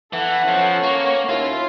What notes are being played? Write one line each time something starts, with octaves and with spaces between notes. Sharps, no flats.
E3 B3 A4 F#5
F3 C#4
A#3 C#6
D#2 E4 F4